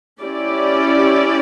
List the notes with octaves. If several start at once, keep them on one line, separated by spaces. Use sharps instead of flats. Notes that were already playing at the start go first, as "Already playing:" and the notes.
C#4 E4 G4 D5